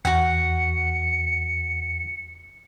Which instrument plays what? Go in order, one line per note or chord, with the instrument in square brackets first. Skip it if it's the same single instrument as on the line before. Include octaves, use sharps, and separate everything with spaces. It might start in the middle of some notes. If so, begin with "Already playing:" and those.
[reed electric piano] E2 [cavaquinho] F#4 F#5 [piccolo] C#7